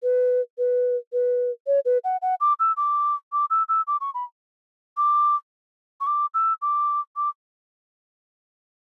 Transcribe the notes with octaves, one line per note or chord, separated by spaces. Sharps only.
B4
B4
B4
C#5
B4
F#5
F#5
D6
E6
D6
D6
E6
E6
D6
C#6
B5
D6
C#6
D6
E6
D6
D6